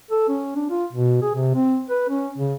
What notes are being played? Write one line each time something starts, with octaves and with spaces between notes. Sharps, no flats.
A4
C#4
D4
F4
B2
G#4
C3
C4
B4
C#4
C#3